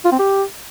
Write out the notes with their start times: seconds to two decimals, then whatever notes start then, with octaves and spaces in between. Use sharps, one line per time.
0.05 F4
0.12 C4
0.19 G4